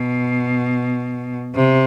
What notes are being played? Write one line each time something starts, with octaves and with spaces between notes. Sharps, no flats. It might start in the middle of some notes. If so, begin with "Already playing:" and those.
Already playing: B2
C3